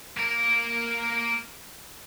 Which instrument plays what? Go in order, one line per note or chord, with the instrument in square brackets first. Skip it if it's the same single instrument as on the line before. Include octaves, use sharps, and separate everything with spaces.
[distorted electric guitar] A#3 A#4